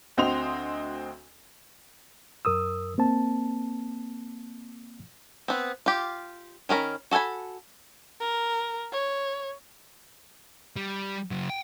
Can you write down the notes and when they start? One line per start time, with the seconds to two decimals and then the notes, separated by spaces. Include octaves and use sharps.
0.17 D2 C4 F#4 D#5 C6 F7
2.45 F#2 A#4 D#6 E6
2.98 A#3 C4 A5
5.48 B3 C4
5.86 F4 G4
6.69 D#3 C#4 A#4 B5
7.11 F#4 A4 F5 G#5 B5
8.20 A#4
8.92 C#5
10.76 G3
11.31 C#3 F#3
11.49 F#5 G5